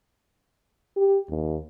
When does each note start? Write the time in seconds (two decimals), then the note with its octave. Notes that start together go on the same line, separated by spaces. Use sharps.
0.97 G4
1.29 D#2